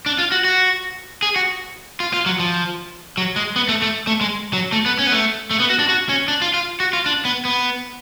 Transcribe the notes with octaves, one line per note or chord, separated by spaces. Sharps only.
D4
F4
F#4
F#4
G#4
F#4
F4
F4
F#3
F3
F#3
G#3
B3
A3
A3
A3
G#3
F#3
A3
B3
C#4
B3
A3
A3
B3
F#4
D4
F#4
C#4
D4
F4
F4
F#4
F4
D4
B3
B3